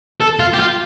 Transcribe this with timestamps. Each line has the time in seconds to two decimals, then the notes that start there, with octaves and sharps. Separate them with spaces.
0.21 A4
0.40 F4
0.53 G4
0.59 F4